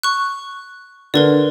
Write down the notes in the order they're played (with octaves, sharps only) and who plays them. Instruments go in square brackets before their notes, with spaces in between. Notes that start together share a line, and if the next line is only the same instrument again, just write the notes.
[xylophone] C#6 F#6
[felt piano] D3 [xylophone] A#4 B4 D5